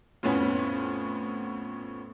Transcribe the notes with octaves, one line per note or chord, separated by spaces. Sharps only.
F2 A2 B3 C#4